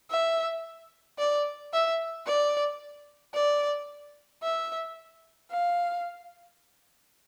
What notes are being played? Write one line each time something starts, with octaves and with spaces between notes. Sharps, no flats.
E5
D5
E5
D5
D5
E5
F5